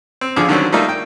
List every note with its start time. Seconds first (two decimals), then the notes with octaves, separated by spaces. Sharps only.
0.21 C4
0.36 A#1 D3 F3 G#4 D6
0.49 D3 D#3 F#3 G3 C4 C#4
0.73 G3 A3 A#3 D#4 F4
0.89 G5